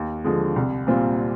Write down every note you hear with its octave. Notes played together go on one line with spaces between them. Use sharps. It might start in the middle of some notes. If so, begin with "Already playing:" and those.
Already playing: D#2
D3 F3 G#3
C2
A#2 G3 C4 F4